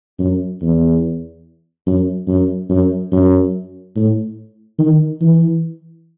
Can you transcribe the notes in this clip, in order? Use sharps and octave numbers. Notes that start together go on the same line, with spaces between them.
F#2
E2
F#2
F#2
F#2
F#2
A2
D#3
E3